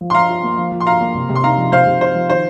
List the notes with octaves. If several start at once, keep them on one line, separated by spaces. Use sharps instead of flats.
F3
C6
F3 F5 A#5
F4
A#3
F3
F3
C6
F4 F5 A#5
A#3
C3
C3
C6
D#4 F5 A#5
F3
C3 C5 F5
C3
D#4 C5
F3
D#3 C5